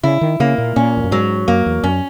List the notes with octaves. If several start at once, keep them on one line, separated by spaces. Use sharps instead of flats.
C#3 E4
D#3
C#3 A#3
A#2
A#2 C#4
E2
F#2
G#2 F#3
F#2 A#3
E2
F#2 C#4